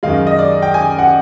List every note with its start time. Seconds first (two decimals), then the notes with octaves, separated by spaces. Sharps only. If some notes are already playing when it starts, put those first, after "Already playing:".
0.03 F#2 D#3 G#3 F5
0.27 D#5
0.39 D5
0.62 G5
0.74 G#5
0.99 F#5